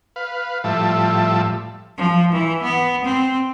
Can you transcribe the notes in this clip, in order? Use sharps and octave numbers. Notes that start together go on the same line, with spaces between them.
B4 F5
A2 F3 G3 E5 A5
F3
E3
B3
C4